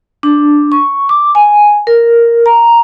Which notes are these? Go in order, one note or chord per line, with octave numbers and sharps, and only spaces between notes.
D4
C#6
D6
G#5
A#4
A#5